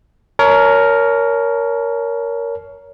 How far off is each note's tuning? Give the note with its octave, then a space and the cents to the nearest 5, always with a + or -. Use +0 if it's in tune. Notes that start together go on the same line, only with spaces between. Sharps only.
A#4 +0 C#5 +20 A5 -25